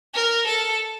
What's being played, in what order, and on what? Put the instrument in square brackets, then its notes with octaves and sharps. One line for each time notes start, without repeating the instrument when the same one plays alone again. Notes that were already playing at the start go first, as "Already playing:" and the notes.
[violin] A#4
A4